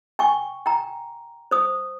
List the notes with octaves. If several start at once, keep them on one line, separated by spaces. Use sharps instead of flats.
G5 G#5 C#6
G5 A#5
C5 D#6